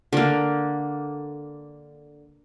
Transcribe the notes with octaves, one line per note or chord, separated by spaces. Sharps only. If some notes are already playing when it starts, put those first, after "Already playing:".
D3 A#3